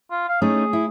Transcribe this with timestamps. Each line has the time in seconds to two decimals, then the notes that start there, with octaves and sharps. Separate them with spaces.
0.11 F4
0.29 F5
0.42 A3 C#4 D#4 G#4
0.73 E4